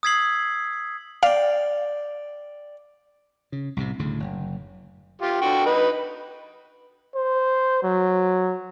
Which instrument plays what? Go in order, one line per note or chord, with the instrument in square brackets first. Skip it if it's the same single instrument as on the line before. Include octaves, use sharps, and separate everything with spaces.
[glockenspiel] D#6 E6 G#6 B6 C7 F#7
[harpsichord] D5 G5 [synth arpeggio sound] F5
[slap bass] C#3
C2 A2 C3
D2 A2 C#3
F#1
[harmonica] F4 G4
D3 F#4 G5
D#4 B4
[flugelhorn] C5
F#3